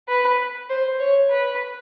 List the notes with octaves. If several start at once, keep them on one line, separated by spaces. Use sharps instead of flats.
B4
C5
C#5
B4